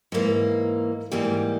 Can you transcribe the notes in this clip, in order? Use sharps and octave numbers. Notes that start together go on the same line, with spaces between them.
G#2 E3 A#3
G#2 E3 G3 A#3